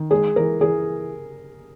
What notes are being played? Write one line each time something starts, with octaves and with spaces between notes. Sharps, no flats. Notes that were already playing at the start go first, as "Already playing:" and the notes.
Already playing: D#3
G#3 G#4
E3 A#4
E3 G#4